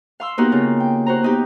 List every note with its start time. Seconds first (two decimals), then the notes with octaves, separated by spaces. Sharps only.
0.20 F5 C6 E6
0.38 A#3 B3 D#4 F#4 G4 A#4
0.52 C#3 F4
0.80 G5
1.06 F#4 C5 A#5
1.23 B3 D#4 G4